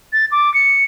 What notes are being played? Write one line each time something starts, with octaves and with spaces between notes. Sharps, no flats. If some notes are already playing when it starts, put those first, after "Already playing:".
A6
D6
C#7